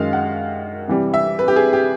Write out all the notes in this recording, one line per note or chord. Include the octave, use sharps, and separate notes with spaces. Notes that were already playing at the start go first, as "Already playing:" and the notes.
Already playing: F#2 D#3 G#3 F5
F#5
C3 E3 G3
E5
B4
G4
G#4
G4